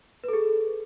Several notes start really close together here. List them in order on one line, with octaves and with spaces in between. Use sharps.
B4 A4 G#4